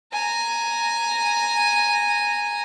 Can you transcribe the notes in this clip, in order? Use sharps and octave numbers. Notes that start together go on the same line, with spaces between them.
G#5 A#5